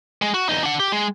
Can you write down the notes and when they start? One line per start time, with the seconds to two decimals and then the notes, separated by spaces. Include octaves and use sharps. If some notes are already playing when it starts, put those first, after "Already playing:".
0.22 G#3
0.34 F#4
0.49 E2 D#4
0.63 D4 F#5
0.80 G4
0.92 G#3